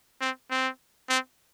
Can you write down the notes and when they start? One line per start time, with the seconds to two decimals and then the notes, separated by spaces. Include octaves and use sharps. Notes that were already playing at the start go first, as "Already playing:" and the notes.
0.21 C4
0.51 C4
1.09 C4